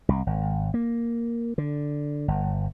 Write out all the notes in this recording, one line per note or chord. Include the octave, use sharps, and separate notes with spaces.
C2
G#1
A#3
D3
G1